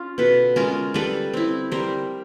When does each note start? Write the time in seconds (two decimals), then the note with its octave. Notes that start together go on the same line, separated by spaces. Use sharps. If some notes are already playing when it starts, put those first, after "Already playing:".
Already playing: C#4 F4
0.18 B2 A4 B4
0.56 G#3 C#4 F4 G#4 A#4
0.94 G3 A4 B4
1.33 C4 E4
1.72 G3 A#4 C5